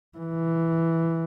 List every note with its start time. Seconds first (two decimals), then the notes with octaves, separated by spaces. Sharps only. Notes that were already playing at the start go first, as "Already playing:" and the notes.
0.18 E3